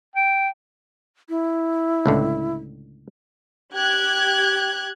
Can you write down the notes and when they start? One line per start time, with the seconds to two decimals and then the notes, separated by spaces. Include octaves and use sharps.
0.15 G5
1.29 E4
2.06 C#2 A2 D3
3.73 G4 F#6 G#6